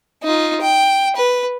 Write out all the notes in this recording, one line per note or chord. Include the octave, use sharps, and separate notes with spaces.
D#4 F4
G5
B4